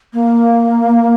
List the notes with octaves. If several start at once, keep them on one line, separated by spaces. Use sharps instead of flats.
A#3